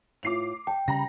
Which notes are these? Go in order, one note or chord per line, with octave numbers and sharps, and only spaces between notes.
A2 E4 F4 D6 C7 F7
G5 A5
C#3 G3 A#5 B5 A#6